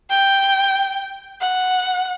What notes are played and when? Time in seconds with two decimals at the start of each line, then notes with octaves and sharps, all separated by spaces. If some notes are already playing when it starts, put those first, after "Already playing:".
0.10 G5
1.41 F#5